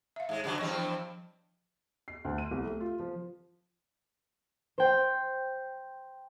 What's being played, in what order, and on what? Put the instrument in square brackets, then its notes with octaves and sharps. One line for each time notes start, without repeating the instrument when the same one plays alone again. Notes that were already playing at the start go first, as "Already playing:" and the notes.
[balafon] E5 F5
[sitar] G#2 G#3
G2 D3 F#3
[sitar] E2 G2 C4 [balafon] F3 D#5
[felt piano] C7
D2
D#7
C2
A3
F4
F3
[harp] C5 G5